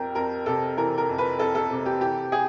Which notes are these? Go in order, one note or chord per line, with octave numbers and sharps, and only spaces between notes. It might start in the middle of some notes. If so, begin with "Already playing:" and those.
Already playing: F2 G4 A#4
F2 A#4
C3 A4
E3 A#4
A#4
F2
B4
F2 A4
A4
C3
G4
E3 G4
G#4